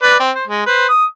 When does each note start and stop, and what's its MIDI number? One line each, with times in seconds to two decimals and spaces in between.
0.03 0.18 71
0.03 0.18 74
0.20 0.31 60
0.35 0.45 72
0.48 0.66 56
0.67 0.87 71
0.67 0.87 72
0.89 1.05 87